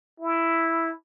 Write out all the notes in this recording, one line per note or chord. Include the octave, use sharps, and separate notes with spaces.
E4